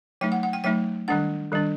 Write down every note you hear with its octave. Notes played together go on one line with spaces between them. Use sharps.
F#3 A3 D#4 G5
F#5
F#5
G5
F#3 A3 D#4 G5
D#3 G3 D4 F#5
D#3 G3 D4